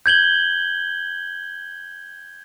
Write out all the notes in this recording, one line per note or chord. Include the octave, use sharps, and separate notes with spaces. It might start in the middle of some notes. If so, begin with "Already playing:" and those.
G6 G#6 F#7 G7